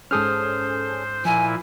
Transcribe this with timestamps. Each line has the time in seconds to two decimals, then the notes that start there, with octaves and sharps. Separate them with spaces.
0.11 G#2 C#4 G#4 A4 C5 D#6 F6
1.25 A#2 F3 E4 G#5